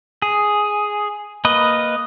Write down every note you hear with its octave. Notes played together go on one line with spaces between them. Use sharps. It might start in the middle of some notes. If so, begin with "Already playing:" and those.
G#4
A#3 B4 D#5